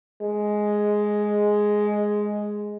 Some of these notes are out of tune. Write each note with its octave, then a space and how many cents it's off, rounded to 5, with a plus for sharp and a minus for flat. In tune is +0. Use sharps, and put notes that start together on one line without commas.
G#3 +5